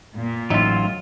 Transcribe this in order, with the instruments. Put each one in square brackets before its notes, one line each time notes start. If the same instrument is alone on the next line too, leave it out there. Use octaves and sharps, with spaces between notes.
[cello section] A#2
[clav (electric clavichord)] A1 D#4 E5 [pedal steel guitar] F#3 F4